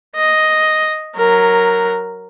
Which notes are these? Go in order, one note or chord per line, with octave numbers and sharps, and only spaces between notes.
D#5
F#3 A#4